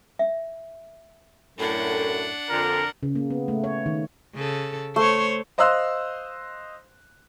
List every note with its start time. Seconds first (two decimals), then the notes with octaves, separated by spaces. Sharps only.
0.19 E5
1.58 F#2 A2 D4 F#5
2.50 F2 D3 A#4
3.03 C#3
3.15 A#3
3.30 B3
3.48 A3
3.64 C#5
3.86 D#3
4.34 C#3 A4
4.96 A3 C5 C#5
5.58 C5 D#5 F5 C6 E6 F#6